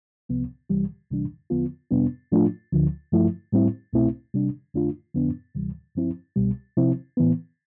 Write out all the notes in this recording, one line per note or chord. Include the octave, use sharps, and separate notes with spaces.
C2 C3 F3 B3
C2 C3 E3 G3
C2 C3 E3 G3 D4
E2 D3 F3 B3 F4
F2 C3 G3 B3 D4
A2 F3 A3 D4 F4
D2 D3 F3
G2 F3 A3 E4
A2 G3 C4 E4
C2 B2 A3 C4 E4
C3 G3 D4
F2 D3 A3 D4 F4
F2 D3 F3 B3 D4
D2 C3 E3 G3
G2 F3 C4 E4
C2 B2 G3
C3 F3 C4 E4
A2 E3 B3